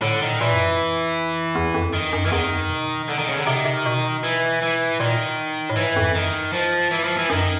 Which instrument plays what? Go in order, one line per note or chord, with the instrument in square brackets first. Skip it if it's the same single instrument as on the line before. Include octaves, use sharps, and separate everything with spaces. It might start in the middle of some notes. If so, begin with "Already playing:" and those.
[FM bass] A2 [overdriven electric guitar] D3
[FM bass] A#2 [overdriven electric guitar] D#3
[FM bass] A#2 [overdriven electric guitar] E3
[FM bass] F#2
F2
E2
F2
[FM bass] G2 [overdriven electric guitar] D#3
[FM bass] F#2
[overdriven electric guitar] E3
[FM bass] E2 [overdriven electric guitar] D#3
[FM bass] F2
F#2
B2
[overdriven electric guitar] D3
D#3
C#3
D3
[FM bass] C3 [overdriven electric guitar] D#3
[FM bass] C3
B2
[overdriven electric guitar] E3
E3
[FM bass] A2
[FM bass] A#2 [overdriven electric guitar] D#3
[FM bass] A2
[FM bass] G#2 [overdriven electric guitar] E3
[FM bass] F2
[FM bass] F#2 [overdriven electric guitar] D#3
[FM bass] G2
[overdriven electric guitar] F3
E3
F3
E3
[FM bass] F#2 [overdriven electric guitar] D#3